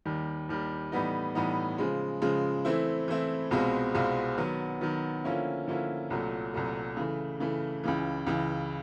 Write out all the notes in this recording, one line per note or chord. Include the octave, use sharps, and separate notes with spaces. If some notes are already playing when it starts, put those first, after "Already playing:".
D#2 D#3 G3
D#2 D#3 G3
A2 E3 G3 B3 D#4
A2 E3 G3 B3 D#4
C#3 F3 G#3
C#3 F3 G#3
E3 A3 C4 E4
E3 A3 C4 E4
C2 B2 G#3 C4 F4
C2 B2 G#3 C4 F4
D#3 F#3 B3
D#3 F#3 B3
D3 F3 A#3 C#4 E4
D3 F3 A#3 C#4 E4
C2 A#2 F#3 A3
C2 A#2 F#3 A3
C#3 E3 A3
C#3 E3 A3
C#2 C#3 E3
C#2 C#3 E3